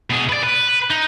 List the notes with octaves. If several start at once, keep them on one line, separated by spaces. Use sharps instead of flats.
B2 G#4
B4 D5
B4
D#4